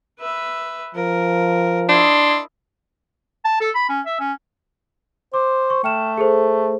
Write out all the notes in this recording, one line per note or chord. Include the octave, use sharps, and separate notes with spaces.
B4 E5
F3 A#4
D4 E4 D#5 C6
A5
A4
B5
C#4
E5
C#4
C5 D6
C#6
A3 G5 F6 E7
G#4 A4 C5